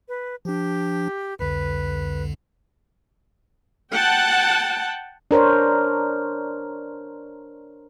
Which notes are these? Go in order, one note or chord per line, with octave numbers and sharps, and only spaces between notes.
B4
F3 D4 G4
C2 F2 D3 B4
F#5 G5 A5
D4 A#4 C5 C#5